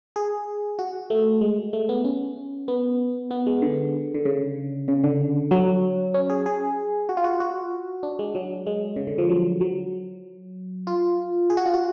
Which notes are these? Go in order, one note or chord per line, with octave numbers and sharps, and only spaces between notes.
G#4
F#4
A3
G#3
A3
B3
C#4
B3
B3
G#3
D3
D3
C#3
C#3
D3
F#3
C#4
G#4
G#4
F#4
F4
F#4
F#4
D4
G#3
F#3
G#3
C#3
D3
F3
F#3
F#3
F4
G#4
F#4
F4
F#4